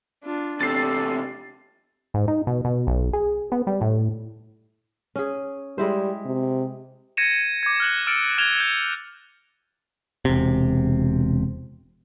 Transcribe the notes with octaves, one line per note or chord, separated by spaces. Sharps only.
D4 F4
E2 C3 G4 A4 A6 C7
G#2
D#4
B2
B2
B1
G#4
B3
G3
A2
C#4 G#4
G3 G#3 E4 C5
C3
G#6 A#6 C#7 D#7 E7
D6 G#6
F6 F#6 F#7
E6 F6 A6 C#7 D7
F6 G#6 E7 F7 G7
G6 F7
E1 C3